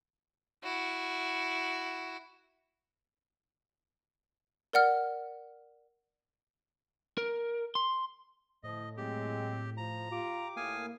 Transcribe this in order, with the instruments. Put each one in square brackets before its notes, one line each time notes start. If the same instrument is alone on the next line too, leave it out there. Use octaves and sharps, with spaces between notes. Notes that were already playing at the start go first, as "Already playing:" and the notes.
[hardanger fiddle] E4 F#4
[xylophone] A#4 D5 F#5 F6
[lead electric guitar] A#4
C6
[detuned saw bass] A2 [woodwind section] D3 F3 [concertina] D#5
[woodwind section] F#3 A#3 C4 [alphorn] G#3 [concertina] G4
[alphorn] F3 [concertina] A#5
[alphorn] F4 [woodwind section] G4 D6
[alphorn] A2 [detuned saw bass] A#3 [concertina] F5 G#5 D#6